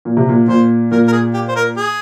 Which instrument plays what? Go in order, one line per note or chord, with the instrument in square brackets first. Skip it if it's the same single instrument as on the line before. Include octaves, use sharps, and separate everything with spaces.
[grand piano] A#2
C3
A#2
[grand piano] A#2 [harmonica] C5
[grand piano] A#2 [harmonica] A#4
[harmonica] A#4
G#4
G4
C5
A#4
G#4